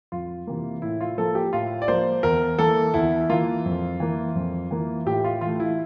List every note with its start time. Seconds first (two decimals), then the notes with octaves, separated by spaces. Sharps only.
0.12 F2 F4
0.47 C3 E3 A#3
0.82 A2 E4
1.01 F4
1.18 F3 A#3 A4
1.35 G4
1.53 A2 F4
1.82 D5
1.88 F3 A#3 C5
2.23 E2 A#4
2.59 E3 A#3 A4
2.94 E2 E4
3.29 E3 A#3 F4
3.66 F2
4.00 E3 A#3
4.35 F2
4.71 E3 A#3
5.06 A2 G4
5.24 F4
5.41 E3 A3 F4
5.60 E4